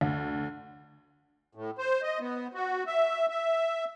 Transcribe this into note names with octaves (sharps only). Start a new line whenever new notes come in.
D2
A2
C5
D#5
B3
F#4
E5
E5